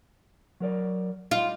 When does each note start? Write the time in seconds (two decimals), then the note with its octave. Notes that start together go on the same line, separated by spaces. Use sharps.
0.60 F#3 A#4 D5
1.31 G3 D#4 F4